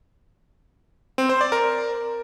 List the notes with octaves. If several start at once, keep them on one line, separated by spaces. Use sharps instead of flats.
C4
C5
D5
A#4